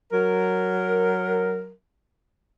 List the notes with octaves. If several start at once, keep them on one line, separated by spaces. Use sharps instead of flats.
F#3 A#4